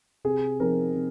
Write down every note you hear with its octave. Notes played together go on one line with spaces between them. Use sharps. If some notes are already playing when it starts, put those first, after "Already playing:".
C3 G#4
F3 C4 D#4 A#4
C3